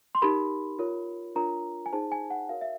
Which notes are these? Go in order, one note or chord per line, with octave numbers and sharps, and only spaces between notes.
C6
D#4 G4 A#4 B5
F4 A#4 C#5
D4 F4 A#4 C#5 A#5
G#5
D#4 G#4 C5 A5
G#5
F#5
F#4 A#4 C#5 F5
E5